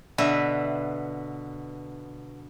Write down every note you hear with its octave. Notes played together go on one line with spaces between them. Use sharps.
B2 D3 B4 E5